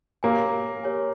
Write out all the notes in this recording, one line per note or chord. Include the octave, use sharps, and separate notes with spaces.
A#3 G4 A#4 C#5 G#5
G4 A#4 C#5 G#5